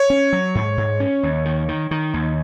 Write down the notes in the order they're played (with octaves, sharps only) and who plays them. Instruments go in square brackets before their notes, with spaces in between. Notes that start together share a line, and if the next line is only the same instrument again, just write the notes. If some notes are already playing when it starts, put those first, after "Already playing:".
Already playing: [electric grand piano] C#5
[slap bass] C#4
F#3
G#2
G#2
C#4
D#2
D#3
D#3
D#3
D#2